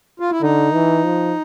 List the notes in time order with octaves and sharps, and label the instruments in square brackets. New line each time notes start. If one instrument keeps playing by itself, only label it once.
[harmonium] F4
E4
[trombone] D3 [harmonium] D#4
[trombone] E3
F3